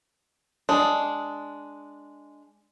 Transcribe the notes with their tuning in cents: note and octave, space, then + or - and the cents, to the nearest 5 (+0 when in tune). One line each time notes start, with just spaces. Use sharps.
G#3 +0 D4 +0